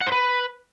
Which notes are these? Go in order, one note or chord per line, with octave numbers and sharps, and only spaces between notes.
F#5
C5
B4